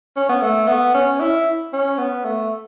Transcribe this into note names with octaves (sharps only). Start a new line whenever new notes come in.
C#4
B3
A3
B3
C#4
E4
C#4
B3
A3